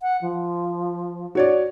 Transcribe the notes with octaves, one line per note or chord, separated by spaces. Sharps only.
F#5
F3
F#4 C#5 D5